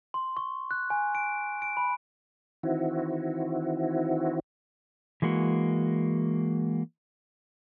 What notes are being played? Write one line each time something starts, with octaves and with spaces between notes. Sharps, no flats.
C6
C#6
F#6
G#5
D7
D7
B5
D#3 E3 C4 E4 F#4
E3 G#3 A#3 F#4